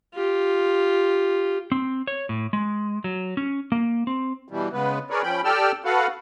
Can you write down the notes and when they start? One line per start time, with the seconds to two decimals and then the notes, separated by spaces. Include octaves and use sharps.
0.14 F4 G4
1.72 C4
2.07 C#5
2.29 A2
2.53 G#3
3.04 F#3
3.37 C#4
3.72 A#3
4.07 C4
4.48 B2 E3 G3
4.73 C#3 G#3 B3 B4
5.10 G#4 A#4 B4 C#5 D5
5.23 F3 C#4 G5 B5
5.44 G4 A4 D5 G5 E6 F6
5.85 F#4 A4 B4 F5 F#5